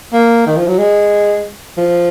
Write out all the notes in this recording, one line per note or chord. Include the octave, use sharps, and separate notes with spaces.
A#3
D#3
F3
F#3
G#3
F3